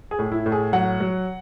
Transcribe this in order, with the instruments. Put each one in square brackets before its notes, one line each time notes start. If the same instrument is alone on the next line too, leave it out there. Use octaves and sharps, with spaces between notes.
[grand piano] G#4
A2
E4
A2
G#4
F#3 F#5
F#3